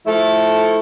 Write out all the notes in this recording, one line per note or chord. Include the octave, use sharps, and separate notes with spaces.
F3 A3 E4 A4